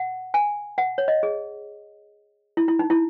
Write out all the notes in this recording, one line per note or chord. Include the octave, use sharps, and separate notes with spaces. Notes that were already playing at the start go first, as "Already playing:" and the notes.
Already playing: F#5
G#5
F#5
C#5
D#5
G#4
E4
E4
D#4
E4